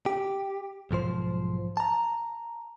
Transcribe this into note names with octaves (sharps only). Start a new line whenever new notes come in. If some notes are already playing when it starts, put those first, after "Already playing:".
G4
B1 G#2 F3 C5
A5 A#5